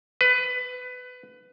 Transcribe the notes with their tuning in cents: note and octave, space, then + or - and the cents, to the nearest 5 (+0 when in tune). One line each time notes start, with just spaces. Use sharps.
B4 +20